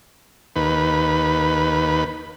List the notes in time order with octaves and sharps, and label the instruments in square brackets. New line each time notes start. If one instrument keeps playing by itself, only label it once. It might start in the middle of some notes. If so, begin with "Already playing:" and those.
[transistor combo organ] D#2 B4